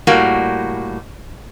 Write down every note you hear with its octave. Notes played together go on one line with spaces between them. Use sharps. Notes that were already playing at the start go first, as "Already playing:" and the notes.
A2 G3 A#3 F#4